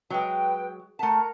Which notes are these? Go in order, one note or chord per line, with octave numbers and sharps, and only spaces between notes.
F#3 G#3 B4 G5
A3 A#4 F#5 A5 A#5